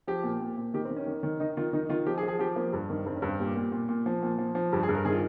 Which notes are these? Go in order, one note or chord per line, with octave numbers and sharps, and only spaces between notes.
F3 G4
A#2
A#2
A#2
D#3 G4
C4
D#3
C#4
D#3
D#3
D#3 D#4
D#3 F4
D#3 D#4
D#3 F4
F3 G4
G#4
F3
G#4
F3 G4
F3 A#3
G2
D#3
G2 C4
C#4
G2
C4
A#2 G4
A#2
A#2
A#2
F3
A#2
F3
F3
G2 G4
G#4
G2
A#4
D#3 G#4
F4